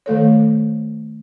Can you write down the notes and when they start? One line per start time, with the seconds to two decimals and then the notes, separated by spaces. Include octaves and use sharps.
0.06 D#3 A3 A4 C#5